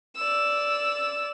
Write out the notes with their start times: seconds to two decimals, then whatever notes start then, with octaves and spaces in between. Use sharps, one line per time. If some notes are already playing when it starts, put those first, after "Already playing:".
0.16 D5 E6